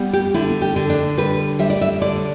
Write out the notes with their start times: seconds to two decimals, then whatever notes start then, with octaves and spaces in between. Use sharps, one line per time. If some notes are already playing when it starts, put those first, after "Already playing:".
Already playing: G3 B3
0.13 G4
0.34 D3 E4
0.61 G4
0.76 D3
0.90 D4
1.17 G3 B4
1.59 G3 E5
1.70 D5
1.81 E5
2.01 D3 D5